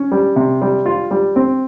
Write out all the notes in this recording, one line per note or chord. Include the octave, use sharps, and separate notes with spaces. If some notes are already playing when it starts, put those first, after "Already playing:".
Already playing: C#4
G3
C3
G3
F4
G3
C4